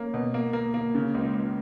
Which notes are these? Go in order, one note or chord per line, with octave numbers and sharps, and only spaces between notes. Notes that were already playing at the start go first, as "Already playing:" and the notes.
Already playing: A#3 C#4
B2
A#3
A#3
A#3
C#3
C#2
C#2